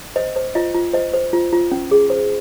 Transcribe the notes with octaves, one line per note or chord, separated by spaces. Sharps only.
C5 D#5
C5
F4 D#5
F4
C5 D#5
C5
F4
F4
C#4
G#4
C5